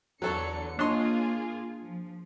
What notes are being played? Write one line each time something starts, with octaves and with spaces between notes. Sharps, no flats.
E2 D3 F#3 A4 C#5 C#7
A#3 D4 F4 G#4 C#5 D#5 C6
F3